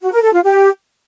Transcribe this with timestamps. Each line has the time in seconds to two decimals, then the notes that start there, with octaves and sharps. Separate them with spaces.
0.02 F#4
0.12 A#4
0.23 A4
0.33 F4
0.43 G4